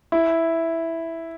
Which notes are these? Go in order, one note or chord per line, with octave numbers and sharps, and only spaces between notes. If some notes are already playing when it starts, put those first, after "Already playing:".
E4